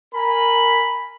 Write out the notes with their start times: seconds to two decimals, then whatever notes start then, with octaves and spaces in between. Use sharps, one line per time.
0.14 A#4 G#5 B5